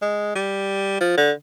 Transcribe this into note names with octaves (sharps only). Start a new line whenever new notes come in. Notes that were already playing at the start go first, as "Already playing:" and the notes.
G#3
G3
F3
D3